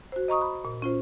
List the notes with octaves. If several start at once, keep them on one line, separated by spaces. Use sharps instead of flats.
F#4 C5
D#5 A#5 C#6 D#6
B5
A#2
C#4 F4 C5